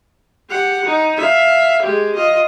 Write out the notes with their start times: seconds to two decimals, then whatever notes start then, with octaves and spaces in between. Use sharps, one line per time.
0.50 G4 F#5
0.86 D#4
1.17 E5 F5
1.83 G#3 G4
2.16 F4 D#5